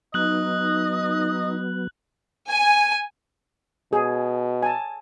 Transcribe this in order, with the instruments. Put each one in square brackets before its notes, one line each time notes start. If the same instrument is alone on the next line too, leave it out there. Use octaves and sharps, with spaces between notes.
[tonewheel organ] F#3 B3 [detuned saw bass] D#4 [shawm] D#5 [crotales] F#6 F#7
[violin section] G#5
[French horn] B2 [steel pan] G#4
[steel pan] G#5 A5